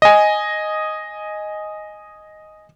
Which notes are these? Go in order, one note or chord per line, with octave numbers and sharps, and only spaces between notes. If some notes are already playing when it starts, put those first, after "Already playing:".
D#5 G#5